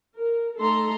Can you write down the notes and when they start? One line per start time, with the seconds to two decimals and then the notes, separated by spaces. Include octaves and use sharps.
0.16 A#4
0.60 A3 D#4 A4 A#5 C6